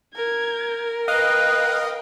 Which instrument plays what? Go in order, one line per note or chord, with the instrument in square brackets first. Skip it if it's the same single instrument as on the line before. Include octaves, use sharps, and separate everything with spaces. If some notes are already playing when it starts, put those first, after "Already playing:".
[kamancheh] A#4 [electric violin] G#6
[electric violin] B4 G5 [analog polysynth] D#5 F5 [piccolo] F#6